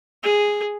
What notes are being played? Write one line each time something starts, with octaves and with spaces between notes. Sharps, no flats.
G#4